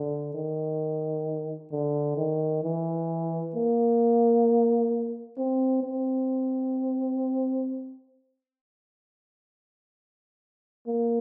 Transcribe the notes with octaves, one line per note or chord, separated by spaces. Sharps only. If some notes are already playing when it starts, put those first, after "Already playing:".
Already playing: D3
D#3
D3
D#3
E3
A#3
C4
C4
A#3